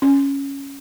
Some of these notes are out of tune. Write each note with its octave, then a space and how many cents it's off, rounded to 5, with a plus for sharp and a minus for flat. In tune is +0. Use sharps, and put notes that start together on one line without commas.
C#4 +0